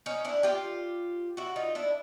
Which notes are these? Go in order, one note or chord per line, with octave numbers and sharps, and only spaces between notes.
C#4 D#4
D4 E4
F4 G4
E4 F#4
D#4 F4
D4 E4